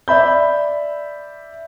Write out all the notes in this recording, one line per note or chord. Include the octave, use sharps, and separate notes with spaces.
D5 E5 B5 G6